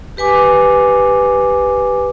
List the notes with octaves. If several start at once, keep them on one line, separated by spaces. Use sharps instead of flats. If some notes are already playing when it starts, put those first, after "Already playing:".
G4 B4 G#5 D6